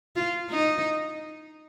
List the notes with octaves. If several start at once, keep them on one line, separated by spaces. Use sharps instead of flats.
F4
D#4